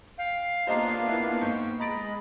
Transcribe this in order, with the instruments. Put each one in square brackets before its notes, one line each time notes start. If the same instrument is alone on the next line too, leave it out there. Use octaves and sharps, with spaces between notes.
[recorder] F5 [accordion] G5
[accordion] G#2 D4 F4 [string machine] A#3 B3 [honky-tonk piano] C5 D#5 A#5
[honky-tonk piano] E4
[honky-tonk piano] G#2 [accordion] C5 G5 C#6
[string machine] G#3 [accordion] D#5 B5 [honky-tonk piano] A#5 A6 D7